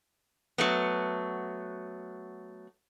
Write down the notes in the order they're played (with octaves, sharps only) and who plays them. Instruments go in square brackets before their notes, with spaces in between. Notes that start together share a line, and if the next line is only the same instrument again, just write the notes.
[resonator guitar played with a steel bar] F#3 A3 B3